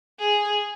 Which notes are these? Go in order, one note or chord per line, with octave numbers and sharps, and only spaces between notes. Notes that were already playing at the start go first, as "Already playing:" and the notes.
G#4